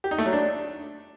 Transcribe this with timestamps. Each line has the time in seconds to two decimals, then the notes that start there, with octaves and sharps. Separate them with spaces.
0.04 G4
0.11 D#4
0.18 A3
0.26 F#3
0.33 D4